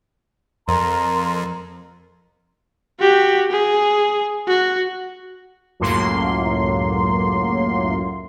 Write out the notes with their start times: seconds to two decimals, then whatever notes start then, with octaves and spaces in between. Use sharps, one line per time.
0.68 F2 A#4 A#5 C6
3.00 F#4 G4
3.52 G#4
4.48 F#4
5.80 C#2 F#2 A2 F#3 A#3 C6